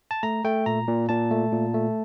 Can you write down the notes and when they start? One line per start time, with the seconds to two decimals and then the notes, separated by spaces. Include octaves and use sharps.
0.11 A5
0.23 A3 A#5
0.44 A3 G5
0.66 A#2 A#5
0.88 A#2
1.09 A#2 A5
1.31 A3
1.52 A#2
1.74 A3